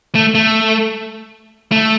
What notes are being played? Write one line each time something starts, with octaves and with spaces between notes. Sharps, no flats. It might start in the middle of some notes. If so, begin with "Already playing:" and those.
A3
A3
A3